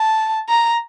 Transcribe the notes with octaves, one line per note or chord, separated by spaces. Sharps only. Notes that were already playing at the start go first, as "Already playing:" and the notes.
Already playing: A5
A#5